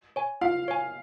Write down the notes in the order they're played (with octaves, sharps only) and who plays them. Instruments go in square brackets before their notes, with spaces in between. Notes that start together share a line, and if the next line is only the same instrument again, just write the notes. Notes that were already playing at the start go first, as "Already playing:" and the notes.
[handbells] C#5 G#5
[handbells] F4 [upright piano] F5
[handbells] C#5 G#5